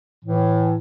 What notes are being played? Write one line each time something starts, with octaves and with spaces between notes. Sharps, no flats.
A2 E3